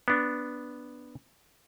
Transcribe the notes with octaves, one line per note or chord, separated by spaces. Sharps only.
B3 D4